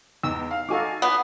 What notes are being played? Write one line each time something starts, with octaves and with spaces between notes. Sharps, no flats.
E2 D#4 E6
F5
D#4 F#4 A4 F5 G#5 D6
B3